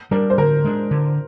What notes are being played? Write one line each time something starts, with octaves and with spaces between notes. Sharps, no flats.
G3 D4 A#4
C5
D3 A#4
G#3 D4
D3